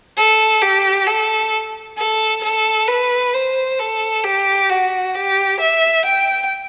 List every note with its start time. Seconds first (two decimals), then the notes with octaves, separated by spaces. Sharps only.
0.17 A4
0.62 G4
1.07 A4
1.97 A4
2.44 A4
2.88 B4
3.34 C5
3.79 A4
4.24 G4
4.70 F#4
5.15 G4
5.60 E5
6.05 G5